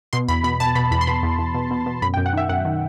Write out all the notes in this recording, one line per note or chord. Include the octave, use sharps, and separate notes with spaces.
B2 C6
E2 B5
B2 B5
B2 A5
B2 B5
E2 B5
C6
B2 B5
E2
E2
B2
B2
B2
F#2 B5
G5
F#2
F#5
D#3 E5
F#2 F#5
D#3